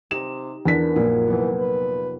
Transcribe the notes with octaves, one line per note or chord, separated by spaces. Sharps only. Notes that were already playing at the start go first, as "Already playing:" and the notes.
C3 D#4 G4 E7
E2 B3 D4 A#4 B6
A#1 F#2 A#2
F1 E3 B3
B4